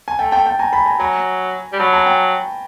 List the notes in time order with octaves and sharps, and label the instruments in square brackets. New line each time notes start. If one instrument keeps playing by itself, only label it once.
[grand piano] G#5
[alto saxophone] A3 [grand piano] G5 A5
[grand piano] G5 A5
G5 A5
G#5 A#5
A5 B5
G#5 A#5
[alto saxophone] F#3 [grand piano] G#5 A#5
[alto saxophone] G3
[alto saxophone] F#3 [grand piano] A5 B5
[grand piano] G#5 A#5
G5 A5